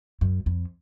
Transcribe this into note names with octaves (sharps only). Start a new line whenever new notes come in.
F#2
F2